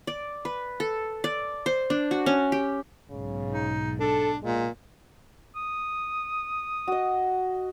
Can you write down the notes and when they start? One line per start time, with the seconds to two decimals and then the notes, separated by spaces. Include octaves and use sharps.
0.07 D5
0.45 B4
0.80 A4
1.24 D5
1.66 C5
1.90 D4
2.11 F#4
2.26 C#4
2.52 G4
3.10 B1 G#2 C#3
3.52 D#4
4.00 D4 A4
4.42 A#2 G#3
5.56 D#6
6.88 F#4 D#5